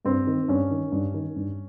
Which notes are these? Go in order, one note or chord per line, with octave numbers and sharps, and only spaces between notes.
G2 C4
D#3
G2 C#4
D#3
G2
D#3
G2